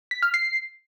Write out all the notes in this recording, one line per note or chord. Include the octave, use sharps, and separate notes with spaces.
B6
F6
C7